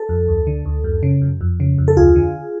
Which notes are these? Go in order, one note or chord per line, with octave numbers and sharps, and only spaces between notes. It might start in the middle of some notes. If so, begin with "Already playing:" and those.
Already playing: A4
F2
D2
D3
D2
F#2
C#3
F#2
F2
C#3
F2
A4
D2 F4 G#4
D3